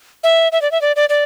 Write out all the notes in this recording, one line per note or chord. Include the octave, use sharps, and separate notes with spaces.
E5
E5
D5
E5
D5
D5
D5